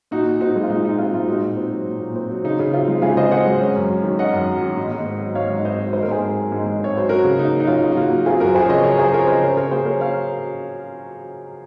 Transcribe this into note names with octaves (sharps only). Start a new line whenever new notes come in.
A#2 D#4 F#4
A#2
C4 D#4 F#4
G#3
F4
A#2 D#4
A#2 D#4
C4 F4
G#3 F4
A#2 D#4 F#4
A#2
C4
F#3
A#2
A#2
C4
F#3
C#3 D#4
C#3
C4 F4
G#3
C#3 F4 G#4
C#3 C5 D#5
C4 D#5 F#5
G#3
C#4
F#2
F#3
D#3
C#4 D#5 F#5
F#2
F#3
D#3
G#2
G#2
C4
F#3
G#2 C#5 F5
G#2
C4 C5 D#5
F#3
G#2 C5
A#4
G#2 G#4 C5
C4
F#3
G#2
G#2
C4 C#5
F#3 C5
C#4 F#4 A#4
C#3
A#3 D#4
F#3
D#4
C#4 F4
C#3
F#4
A#3 F4
F#3
C4 F4 G#4
F#2 F#4 A#4
F3 G#4 C5
C#5
C#3 C5 D#5
C4 A#4 C#5
F#2 G#4 C5
F3 A#4 C#5
C#3 C5 D#5
C#4 A#4 C#5
C5
C#3 A#4 C#5
A#3 G#4 C5
F#3 A#4 C#5
C#4 C#5 F5